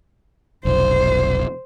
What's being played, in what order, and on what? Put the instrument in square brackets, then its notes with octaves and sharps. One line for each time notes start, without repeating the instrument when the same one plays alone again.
[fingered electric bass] F1 B1 [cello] C5